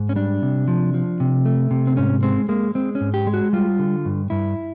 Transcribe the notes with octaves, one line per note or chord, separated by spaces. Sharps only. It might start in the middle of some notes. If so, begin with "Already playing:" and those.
Already playing: G#2
C#4
G3 D4
C3
F3
F3
C3
A3
C3
C4
G#2 C#4
G#3 C4
G#3 A#3
G#3 C4
C#4
G#2
G4
G#3
F#4
G3 F4
D3
G2
G2 E4